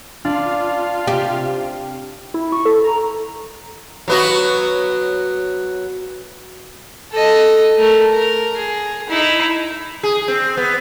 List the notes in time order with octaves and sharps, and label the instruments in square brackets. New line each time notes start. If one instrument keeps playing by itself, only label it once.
[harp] D4 [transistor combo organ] F4
[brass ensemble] C3 [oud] G4
[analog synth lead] E4
C#6
A4
A#5
[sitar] F#3 B3 F#4
[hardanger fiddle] A4 D#5
A3 A#4
A#4
G#4
D#4 E4
[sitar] G#4
C4
B3